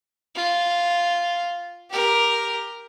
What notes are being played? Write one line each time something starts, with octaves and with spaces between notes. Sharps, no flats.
F4
G4 A#4